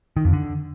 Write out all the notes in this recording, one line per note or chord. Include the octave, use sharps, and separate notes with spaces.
D#3
F2
D3